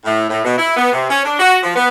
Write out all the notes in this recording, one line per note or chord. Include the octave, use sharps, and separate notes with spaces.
A2
A2
B2
E4
B3
C3
C#4
D4
F#4
F3
B3